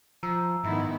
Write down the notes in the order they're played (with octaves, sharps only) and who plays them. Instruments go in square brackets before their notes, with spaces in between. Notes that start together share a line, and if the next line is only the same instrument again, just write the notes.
[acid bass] F3 [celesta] A#5 E6
[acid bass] G#2 [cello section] D#3 B3 E4